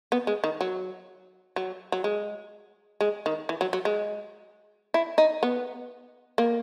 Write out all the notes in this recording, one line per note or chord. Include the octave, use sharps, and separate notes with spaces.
B3
G#3
D#3
F#3
F#3
F#3
G#3
G#3
D#3
E3
F#3
F#3
G#3
E4
D#4
B3
A#3